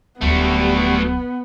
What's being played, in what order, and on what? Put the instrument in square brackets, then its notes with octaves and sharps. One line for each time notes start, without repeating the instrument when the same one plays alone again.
[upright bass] D1 F#3 [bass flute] G3 [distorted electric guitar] A3 F#4 [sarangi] B3